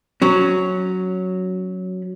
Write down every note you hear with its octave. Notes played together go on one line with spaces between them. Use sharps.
F#3 C#4